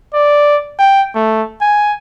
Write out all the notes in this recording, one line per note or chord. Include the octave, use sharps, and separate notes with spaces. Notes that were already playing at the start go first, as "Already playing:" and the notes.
D5
G5
A3
G#5